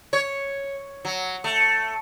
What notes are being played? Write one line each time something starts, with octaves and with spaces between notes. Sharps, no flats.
C#5
F#3
A3